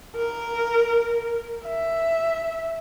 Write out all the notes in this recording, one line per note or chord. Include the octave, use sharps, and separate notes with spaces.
A#4
E5